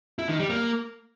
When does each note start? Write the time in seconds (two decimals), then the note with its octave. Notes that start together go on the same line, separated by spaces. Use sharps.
0.19 E4
0.29 D#3
0.39 G3
0.50 A#3